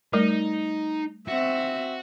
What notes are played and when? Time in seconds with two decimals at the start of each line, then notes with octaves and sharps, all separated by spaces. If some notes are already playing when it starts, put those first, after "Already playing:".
0.13 G3 A3 D#4 A#4
1.28 C4 F#4 E5